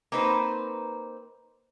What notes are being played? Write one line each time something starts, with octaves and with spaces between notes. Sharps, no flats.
A#3 C4 D#4 B4 C5